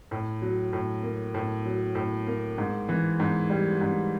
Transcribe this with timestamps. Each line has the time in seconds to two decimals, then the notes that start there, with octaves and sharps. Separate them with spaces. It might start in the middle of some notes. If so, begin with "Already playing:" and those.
0.11 A2
0.42 F#3
0.73 A2
1.03 A#3
1.34 A2
1.66 F#3
1.95 A2
2.27 A#3
2.58 G#2
2.88 E3
3.20 G#2
3.50 G3
3.81 G#2